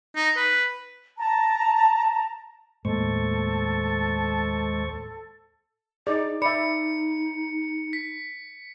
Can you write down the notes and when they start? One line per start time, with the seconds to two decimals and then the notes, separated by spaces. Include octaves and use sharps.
0.16 D#4
0.36 B4
1.17 A5 A#5
2.85 D#2 A2 G#3 A#3 A4 C5 C#6
6.07 D#4 G#4 D5 D#5
6.42 D#4 D5 E5 B5 C#7
7.93 B6